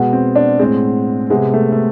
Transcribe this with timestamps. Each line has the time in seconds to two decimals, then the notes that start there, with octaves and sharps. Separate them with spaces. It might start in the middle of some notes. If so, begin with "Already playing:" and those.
Already playing: B2 G#3 B3
0.13 C4
0.36 D4
0.59 A2 G#3 C4
1.30 C3 G#3 B3
1.54 A3
1.72 A3